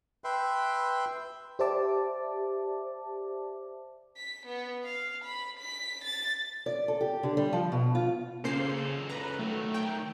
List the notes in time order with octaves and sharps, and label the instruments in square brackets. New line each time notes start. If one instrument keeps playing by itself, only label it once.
[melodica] B4 E5 G5 C6
[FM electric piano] G4 C5 D5 E5 A5 D6
[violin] B6
B3
F5
B5
B6
A6
[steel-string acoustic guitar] D5
A4
G4
D3
G3
F3
B2
F4
[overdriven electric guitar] C#2 A4 [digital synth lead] C#3 [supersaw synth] A#3 C5 C7
[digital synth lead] B4 [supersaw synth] A#5
[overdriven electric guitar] D#3 F#3 [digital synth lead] A3
[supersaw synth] G5